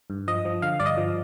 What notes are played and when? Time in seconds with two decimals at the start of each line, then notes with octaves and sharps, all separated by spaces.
0.10 G2
0.28 F3 D#5
0.45 F3
0.62 D3 F5
0.80 G2 D5
0.86 D#5
0.97 F3